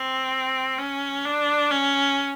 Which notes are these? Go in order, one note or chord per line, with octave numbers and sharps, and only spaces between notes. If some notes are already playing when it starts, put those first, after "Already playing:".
Already playing: C4
C#4
D4
C#4